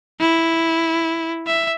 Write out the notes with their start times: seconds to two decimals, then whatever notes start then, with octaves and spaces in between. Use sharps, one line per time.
0.20 E4
1.47 E5